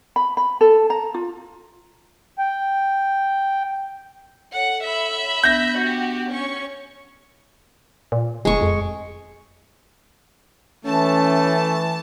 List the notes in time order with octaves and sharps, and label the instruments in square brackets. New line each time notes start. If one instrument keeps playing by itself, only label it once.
[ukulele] B5
B5
A4
A#5
F4
[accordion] G5
[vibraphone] A4 C#5 [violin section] F#5
[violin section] E5 B5
[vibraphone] B3 D4 [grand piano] G6 A#6
[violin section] F#4 G4
C#4 C#6
[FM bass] A#2
[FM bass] F1 [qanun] G#3 C#6
[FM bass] F2
[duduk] E3 [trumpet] A3 [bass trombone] C#4 [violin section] A5